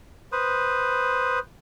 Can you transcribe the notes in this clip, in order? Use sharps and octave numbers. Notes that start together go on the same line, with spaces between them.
B4 C5 D#6